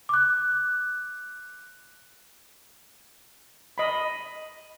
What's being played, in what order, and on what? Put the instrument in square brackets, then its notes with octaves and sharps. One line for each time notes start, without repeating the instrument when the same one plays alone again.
[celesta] D6 F#6
[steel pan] D#5 B5